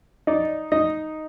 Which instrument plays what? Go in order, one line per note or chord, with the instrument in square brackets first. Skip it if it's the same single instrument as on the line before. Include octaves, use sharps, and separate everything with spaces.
[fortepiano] D#4 D5
D#4 D#5